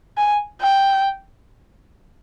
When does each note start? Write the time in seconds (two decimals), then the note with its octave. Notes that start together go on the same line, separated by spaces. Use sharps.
0.17 G#5
0.62 G5